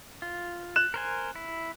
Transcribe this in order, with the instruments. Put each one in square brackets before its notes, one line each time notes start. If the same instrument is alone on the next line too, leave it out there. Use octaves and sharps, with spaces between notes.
[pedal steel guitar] F4
[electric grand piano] F#6 E7
[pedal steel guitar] A#4 C5 G#5
E4